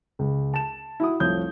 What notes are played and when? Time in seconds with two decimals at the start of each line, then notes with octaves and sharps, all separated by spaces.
0.19 C#2
0.54 A5 E7
1.00 E4 F#4 B5 D#6
1.20 F1 C2 F3 C#5 D#6 G6